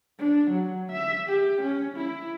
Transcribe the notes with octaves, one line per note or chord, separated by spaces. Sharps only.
D4
F#3
E5
G4
C#4
E4